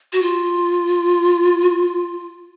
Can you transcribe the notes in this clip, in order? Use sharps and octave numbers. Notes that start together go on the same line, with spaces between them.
F#4
F4